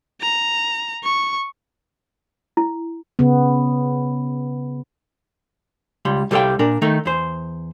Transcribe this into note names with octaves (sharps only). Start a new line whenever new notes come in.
A#5
C#6
E4
C#3 B3
C#2 G3 C6
C2 G3 A4 F5 G5
A#2 D4 A#4
D#3 A3 D#4
E2 C5